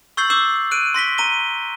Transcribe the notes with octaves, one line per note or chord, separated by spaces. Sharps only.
C#6 E6 G6 A6 C7 F#7
D6 E6 G6 C7 E7
F#6 D7 D#7
C6 A#6 B6 G7
A#5 D#7 G7